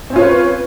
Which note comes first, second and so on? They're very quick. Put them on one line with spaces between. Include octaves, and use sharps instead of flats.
C4 C#4 F4 C#5 B4